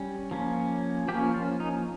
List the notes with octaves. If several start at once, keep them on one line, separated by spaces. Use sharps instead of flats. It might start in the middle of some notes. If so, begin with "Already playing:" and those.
Already playing: G3 C#4
F3 A#3 C#4
F3 A#3 C#4 G4
F4
D#4